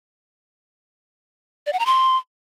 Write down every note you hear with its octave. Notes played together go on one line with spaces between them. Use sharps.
D5
F#5
A#5
C6